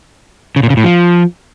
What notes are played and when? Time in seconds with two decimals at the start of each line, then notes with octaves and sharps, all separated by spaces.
0.56 C#3
0.63 A#2
0.70 C#3
0.77 A2
0.84 F3